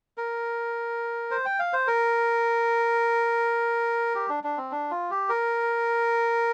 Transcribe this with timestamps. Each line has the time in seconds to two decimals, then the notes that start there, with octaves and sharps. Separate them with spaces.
0.18 A#4
1.31 C5
1.45 G5
1.59 F5
1.73 C5
1.87 A#4
4.15 G4
4.29 D4
4.44 D4
4.57 C4
4.72 D4
4.91 F4
5.11 G4
5.29 A#4